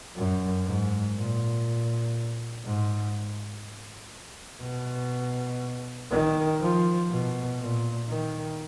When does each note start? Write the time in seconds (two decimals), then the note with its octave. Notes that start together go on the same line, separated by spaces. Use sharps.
0.16 F#2
0.66 G#2
1.15 A#2
2.64 G#2
4.62 B2
6.11 D#3
6.61 F3
7.10 B2
7.60 A#2
8.09 D#3